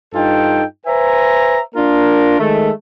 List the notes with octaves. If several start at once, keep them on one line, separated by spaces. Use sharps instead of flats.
G2 D#4 F4 A4 G5
B4 C5 E5 G#5 A#5
A#3 D4 F4 A#4
D#3 G#3 A3